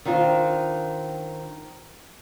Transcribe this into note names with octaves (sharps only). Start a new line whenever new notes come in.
D#3 C4 D4 F4